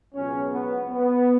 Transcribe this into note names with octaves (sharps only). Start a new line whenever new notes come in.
C#2 B2 F#3 C#4
B3
B3